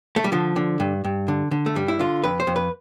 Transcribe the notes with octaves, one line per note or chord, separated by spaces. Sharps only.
A3
G3
D3 F3
D3
G2
G2
D3
D3
A3
G2 G3
E4
D3 F4
F2 B4
C5
F2
B4